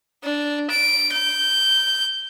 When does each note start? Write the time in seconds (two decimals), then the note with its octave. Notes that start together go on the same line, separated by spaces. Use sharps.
0.24 D4
0.71 D7
1.12 G6